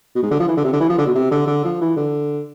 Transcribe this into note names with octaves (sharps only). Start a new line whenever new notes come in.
B2
G#2
D3
F3
E3
D3
C3
D3
E3
F3
D3
B2
C3
D3
D3
F3
E3
D3